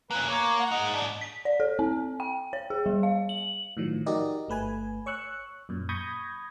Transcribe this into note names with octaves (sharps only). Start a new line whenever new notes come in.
A#3 C#4 B4
A#3 C#5 D6
F#5
G#3 D#4
G#2 D4
B6
D5
A4
C4
G5
C#5
G#4
G3
F5
F#7
A2 D#3 F3 F#3
D#4 F#4 G4 A#4 D5 D#5
G1 A3 B4 G#5
C#5 C#6 E6 F#6
F#2 A#2
B5 C#6 D#6 G6 G#6 A#6